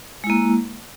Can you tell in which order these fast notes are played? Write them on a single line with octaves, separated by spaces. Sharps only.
G#3 E4 A#3